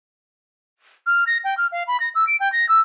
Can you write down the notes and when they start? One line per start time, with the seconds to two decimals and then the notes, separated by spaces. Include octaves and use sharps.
1.07 F6
1.27 A#6
1.44 G5
1.58 F6
1.72 F5
1.88 B5
2.00 A#6
2.15 E6
2.27 D7
2.40 G5
2.53 A#6
2.69 E6